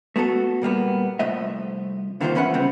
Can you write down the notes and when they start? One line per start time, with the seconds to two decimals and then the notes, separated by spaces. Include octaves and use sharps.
0.16 A3 B3 F#4 A4
0.62 A#2 G3 A#3 B3
1.19 C2 F3 A3 D#5 E5
2.21 G2 D3 D#3 A#3 F4 C5
2.35 E2 F3 C#4 B4 E5 F#5
2.54 C#3 G3 B3 C4